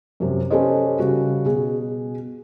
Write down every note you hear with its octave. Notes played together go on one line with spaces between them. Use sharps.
F#2 C3
C#4 G4 A4 B4 C5 D#5
C#3 G3 F#4
B2 G#4